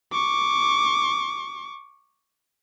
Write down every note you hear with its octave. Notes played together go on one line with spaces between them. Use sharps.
C#6 D6